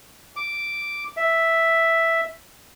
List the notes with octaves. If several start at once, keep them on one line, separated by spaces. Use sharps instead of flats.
D6
E5